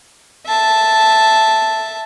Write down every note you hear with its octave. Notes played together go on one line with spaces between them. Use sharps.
E5 A5